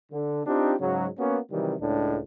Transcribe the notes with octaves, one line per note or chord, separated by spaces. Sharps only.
D3
C4 D4 D#4 F4 G4
G#2 C#3 F#3
A#3 B3 C#4 F#4
C3 D#3 E3 F#3 G3
C#2 A2 G#3 D4